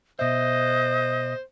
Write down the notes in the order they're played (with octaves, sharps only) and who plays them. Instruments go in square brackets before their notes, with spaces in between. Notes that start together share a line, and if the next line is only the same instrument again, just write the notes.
[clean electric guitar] B2 E5 [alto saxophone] C5 [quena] D#5